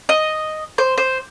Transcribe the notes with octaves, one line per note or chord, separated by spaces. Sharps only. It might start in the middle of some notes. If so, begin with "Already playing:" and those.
D#5
C5
C5